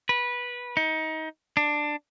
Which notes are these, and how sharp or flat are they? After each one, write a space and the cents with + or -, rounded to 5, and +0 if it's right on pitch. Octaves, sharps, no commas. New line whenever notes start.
B4 -15
D#4 +25
D4 +10